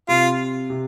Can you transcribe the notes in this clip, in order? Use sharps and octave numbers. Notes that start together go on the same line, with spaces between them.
C3 F4
C3